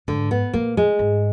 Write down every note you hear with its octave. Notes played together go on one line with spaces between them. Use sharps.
G#2 D3
B3
A#2 A#3
G#3
G#2